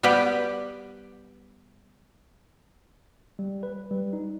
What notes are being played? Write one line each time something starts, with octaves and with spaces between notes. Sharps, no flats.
G3 B3 G4 B4 G5
G3
B4
G3
D#4